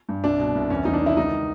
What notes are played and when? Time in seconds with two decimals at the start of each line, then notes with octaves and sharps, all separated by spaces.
0.09 G2
0.24 C2 D4
0.39 B2
0.55 C2
0.70 E2 C#4
0.85 E2 D#4
0.94 D4
1.01 D#3
1.06 E4
1.17 C#2 D#4